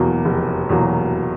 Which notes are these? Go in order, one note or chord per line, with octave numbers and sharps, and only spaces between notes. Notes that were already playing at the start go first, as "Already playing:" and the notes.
Already playing: F1 E2 B2 F#3 A#3
F1
E2 B2 F#3 A#3